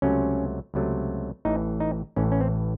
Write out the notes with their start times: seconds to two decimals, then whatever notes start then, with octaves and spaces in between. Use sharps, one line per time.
0.02 C#2 C3 F#3 A3 C#4
0.74 C#2 C3 F#3 A3
1.45 A1 A2 E3 D#4
1.80 D#4
2.16 A1 A2 E3 C#4
2.32 C#4
2.41 C4